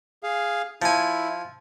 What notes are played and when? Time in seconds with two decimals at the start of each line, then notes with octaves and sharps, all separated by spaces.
0.23 G#4 F5
0.82 F3 E4 G#5